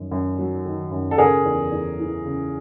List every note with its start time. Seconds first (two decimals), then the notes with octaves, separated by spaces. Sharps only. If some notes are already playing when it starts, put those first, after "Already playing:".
Already playing: F#2 D#3
0.11 F#2
0.38 F#3
0.65 D#3
0.91 F#2
1.11 A4
1.18 C#3 G#4 A#4
1.45 E2
1.72 E2
1.99 E3
2.25 C#3